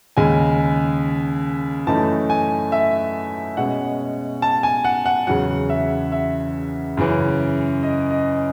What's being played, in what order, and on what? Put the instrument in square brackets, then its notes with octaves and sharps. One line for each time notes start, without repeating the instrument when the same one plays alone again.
[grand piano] D#2 C#3 G#3 G#5
F#2 E3 A3 D#4 A5
G#5
E5
B2 G#3 C#4 F#5
A5
G#5
F#5
F#5
E2 C#3 F#3 F#5
E5
E5
F#2 C#3 E3
D#5
D#5